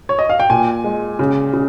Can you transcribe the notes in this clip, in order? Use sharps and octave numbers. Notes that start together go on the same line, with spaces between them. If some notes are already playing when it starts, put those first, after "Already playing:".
C#5
D#5
F5
G5
A#2 G#5
G#3
C#3
C#3